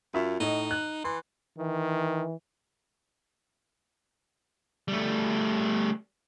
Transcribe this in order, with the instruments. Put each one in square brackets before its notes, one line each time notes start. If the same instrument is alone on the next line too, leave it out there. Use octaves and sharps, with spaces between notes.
[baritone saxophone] F#2 [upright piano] F4 E5
[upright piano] A2 D#5 [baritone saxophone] D#4
[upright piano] F#6
[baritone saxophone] E3 [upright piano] C6
[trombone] D#3 [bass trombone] E3
[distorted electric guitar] G3 A3